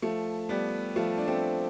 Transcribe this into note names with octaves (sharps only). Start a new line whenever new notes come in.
F3 A3
G3 B3
F3 A3
D4
A3 C4